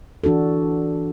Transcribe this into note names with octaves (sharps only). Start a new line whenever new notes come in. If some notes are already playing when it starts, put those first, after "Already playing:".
E3 D4 F#4 A4